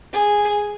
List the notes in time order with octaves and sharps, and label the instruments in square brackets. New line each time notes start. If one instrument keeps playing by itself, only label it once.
[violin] G#4